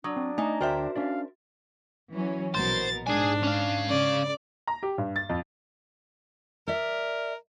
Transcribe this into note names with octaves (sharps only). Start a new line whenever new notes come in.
F#3 D4 D#6
C4
A3 D#4 G#5 A#5
D2 F#4 A#4 C5 D5 E5 G5
C#4 D4 D5 F5
E3 F#3 C#4
A#1 B2 A#4 C5 A6
G#2 D4 G#4 G#5
C#4 F5
C#3 D5
A#5
G4
G2
A6
F2
A#4 D5 E5